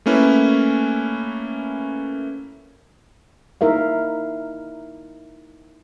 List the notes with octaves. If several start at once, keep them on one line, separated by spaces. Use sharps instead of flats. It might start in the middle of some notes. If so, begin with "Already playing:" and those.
A3 A#3 C#4 E4 B4
D#4 E4 A#4 E5 F5